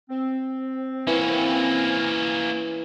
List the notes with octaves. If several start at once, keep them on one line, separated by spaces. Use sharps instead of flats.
C4
E3 A#3 C#4